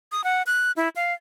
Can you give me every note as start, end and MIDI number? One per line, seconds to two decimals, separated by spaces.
0.12 0.24 87
0.24 0.43 78
0.47 0.72 90
0.77 0.89 64
0.96 1.14 77